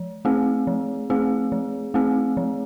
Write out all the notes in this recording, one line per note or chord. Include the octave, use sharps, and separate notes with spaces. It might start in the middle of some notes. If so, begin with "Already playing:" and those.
Already playing: F3
A3 C4 G#4
F3
A3 C4 G#4
F3
A3 C4 G#4
F3